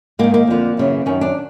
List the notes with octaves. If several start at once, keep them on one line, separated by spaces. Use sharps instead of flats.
G#2 D#3 A#3
A#3
F2 D3 F3
F#2 C#3 E3
F#2 D#3 C#4
D4